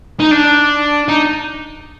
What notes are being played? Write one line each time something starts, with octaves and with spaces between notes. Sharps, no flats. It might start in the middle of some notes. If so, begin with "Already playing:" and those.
D#4
D4
D#4